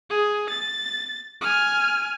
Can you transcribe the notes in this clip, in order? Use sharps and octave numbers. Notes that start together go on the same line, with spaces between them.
G#4
A6
G#5 F6